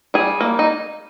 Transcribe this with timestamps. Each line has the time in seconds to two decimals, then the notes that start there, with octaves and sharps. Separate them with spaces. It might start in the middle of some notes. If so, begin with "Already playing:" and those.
0.14 G3 G#4
0.41 A#3
0.59 D#4